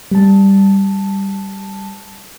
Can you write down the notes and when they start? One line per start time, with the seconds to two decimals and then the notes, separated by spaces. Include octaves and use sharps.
0.11 G3 A5